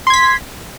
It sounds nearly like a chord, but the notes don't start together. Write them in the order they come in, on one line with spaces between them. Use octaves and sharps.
C6 G#6 B6